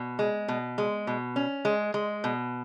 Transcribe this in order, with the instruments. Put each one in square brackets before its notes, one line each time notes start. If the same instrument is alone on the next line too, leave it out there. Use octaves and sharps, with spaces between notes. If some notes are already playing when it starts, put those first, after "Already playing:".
Already playing: [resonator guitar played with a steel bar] B2
G#3
B2
G#3
B2
C#4
G#3
G#3
B2